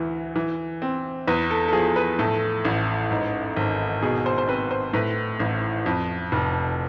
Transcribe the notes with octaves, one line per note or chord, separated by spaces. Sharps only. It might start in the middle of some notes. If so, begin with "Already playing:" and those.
Already playing: D2 E3
E3
C4
E2 B4
A4
A4
F3 G#4
B4
A2 A4
A1
G#2
G#1
B2 G#4
C5
C5
C4 B4
C5
A2 B4
A1
F2
F1